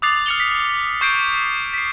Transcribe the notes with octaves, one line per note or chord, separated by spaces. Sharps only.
D6 D#6 F#6 A6 C7 F7
F6 A6 C#7 F7 G7
B6
C#6 G6 C7 D7
B6 C7